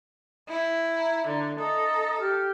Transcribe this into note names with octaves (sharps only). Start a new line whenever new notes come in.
E4
A#5
D3
A4 D#5 A#5 D#6
G4 F6